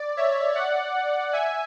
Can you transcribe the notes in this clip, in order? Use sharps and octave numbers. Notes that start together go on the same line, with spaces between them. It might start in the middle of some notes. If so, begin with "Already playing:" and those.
Already playing: D5
C#5 E5
D5 F#5
E5 G#5